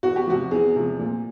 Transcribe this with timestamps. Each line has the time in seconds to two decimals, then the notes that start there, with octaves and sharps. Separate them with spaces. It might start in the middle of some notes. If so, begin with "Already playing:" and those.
0.03 E2 F#4
0.16 G4
0.27 C3 F3 F#4
0.51 E2 G#4
0.76 C3 F3
0.99 A#2